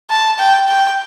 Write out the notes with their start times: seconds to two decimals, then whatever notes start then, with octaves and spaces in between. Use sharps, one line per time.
0.10 A5
0.39 G5
0.69 G5